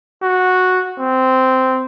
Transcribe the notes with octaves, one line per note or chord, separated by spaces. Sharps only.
F#4
C4